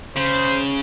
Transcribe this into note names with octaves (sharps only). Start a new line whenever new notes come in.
C#3 C5